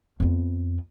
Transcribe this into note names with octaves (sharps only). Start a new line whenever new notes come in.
F2 B3